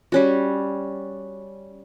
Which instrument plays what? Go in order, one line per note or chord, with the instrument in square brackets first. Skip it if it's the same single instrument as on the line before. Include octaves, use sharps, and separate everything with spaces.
[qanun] G3 C#4 F#4